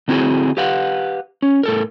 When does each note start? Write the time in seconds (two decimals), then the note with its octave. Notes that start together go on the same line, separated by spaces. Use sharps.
0.08 D3 C4 E4 F#4 G#4
0.57 G4 B4 F5 F#5
1.42 C#4
1.63 A2 A4 A#4